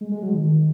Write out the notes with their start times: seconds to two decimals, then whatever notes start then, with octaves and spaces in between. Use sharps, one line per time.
0.01 G#3
0.11 G#3
0.22 F#3
0.34 D#3